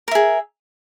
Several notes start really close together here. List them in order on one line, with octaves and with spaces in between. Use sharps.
A#4 E5 G#4